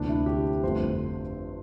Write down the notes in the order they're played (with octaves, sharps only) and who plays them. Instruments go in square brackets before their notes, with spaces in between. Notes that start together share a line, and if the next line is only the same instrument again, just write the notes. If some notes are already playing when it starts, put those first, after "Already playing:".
Already playing: [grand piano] D2 C3 E3 A#3 D4
E4
G4
G1 F2 D3 A3 C4 C5